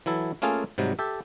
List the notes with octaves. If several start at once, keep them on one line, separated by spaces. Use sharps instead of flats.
E3 F#3 E4 A4
A3 A#3 C#4 F4 G#4 A4
G#2 C3 F#3 G3
G4 A4 E5